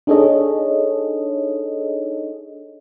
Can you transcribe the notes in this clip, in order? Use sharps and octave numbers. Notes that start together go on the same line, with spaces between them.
D4 D#4 G#4 A4 C#5 D#5